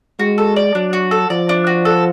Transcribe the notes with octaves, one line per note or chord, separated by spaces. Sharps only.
G#3 F#4
A4
D5
F#3 D4
F#4
A4
F3 D5
D4
F#4
A4